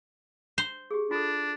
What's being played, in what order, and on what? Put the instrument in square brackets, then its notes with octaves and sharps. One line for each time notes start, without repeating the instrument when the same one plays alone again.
[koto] C5
[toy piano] G4 G#4
[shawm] D4 [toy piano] F4 A4